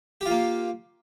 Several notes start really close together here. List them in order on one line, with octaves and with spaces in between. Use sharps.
G4 F4 A#3